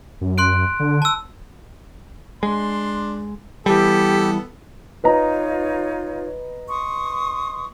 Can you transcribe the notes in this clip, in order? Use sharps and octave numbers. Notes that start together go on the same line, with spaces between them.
F#2
C6 F#6 D7
D3
A5 E6
G#3 D4 C6
E3 G3 B3 G4 A4
D#4 F4 B4 C#5 D#5 A#5
C6 C#6 D#6